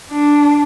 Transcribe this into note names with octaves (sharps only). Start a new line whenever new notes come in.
D4